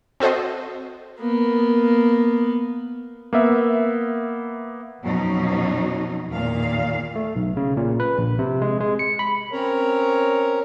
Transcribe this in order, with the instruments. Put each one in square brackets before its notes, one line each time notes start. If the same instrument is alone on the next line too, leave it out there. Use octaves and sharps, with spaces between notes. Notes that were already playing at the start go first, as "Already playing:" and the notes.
[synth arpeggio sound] C4 F#4 A4 C5 D#5
[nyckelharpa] A#3 B3
[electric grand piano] A#3 B3 E5
[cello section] F2 B2 F3 F#3 C#4 D#4
E2 A#2 D#3 F5
[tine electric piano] A3
B1
C#3
A#2
B4
A#1
C3
G#3
G#3
C#7
B5
[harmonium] C4 C#4 A#4 C#5 A#5